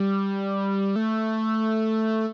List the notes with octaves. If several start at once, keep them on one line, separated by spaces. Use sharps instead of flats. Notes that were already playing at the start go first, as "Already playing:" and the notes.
Already playing: G3
A3